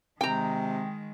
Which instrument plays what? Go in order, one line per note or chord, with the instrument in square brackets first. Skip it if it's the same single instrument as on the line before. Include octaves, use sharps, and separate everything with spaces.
[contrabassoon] C3 [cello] D#3 G#3 [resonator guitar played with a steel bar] G5 A#5